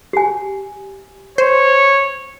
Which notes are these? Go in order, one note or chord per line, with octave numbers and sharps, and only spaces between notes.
G4 G#5
C5 C#5